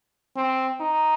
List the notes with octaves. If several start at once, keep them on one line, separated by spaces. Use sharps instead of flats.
C4
D#4